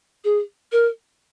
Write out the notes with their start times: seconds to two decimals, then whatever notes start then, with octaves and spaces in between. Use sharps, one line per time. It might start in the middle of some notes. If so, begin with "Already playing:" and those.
0.24 G#4
0.72 A#4